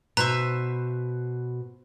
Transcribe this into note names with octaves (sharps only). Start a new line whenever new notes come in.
B2 B4 C5 E5 A#5